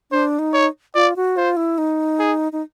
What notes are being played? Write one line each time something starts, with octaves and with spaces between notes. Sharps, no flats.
D4 C5
D#4
C#5
F4 D5
F#4
F4 C5
E4
D#4
G#4
D#4